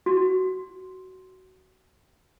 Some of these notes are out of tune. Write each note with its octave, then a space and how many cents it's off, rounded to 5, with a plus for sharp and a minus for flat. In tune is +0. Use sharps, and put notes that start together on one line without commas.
F#4 +15